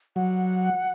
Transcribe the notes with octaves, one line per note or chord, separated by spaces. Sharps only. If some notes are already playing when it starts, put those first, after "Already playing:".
F#3 F#5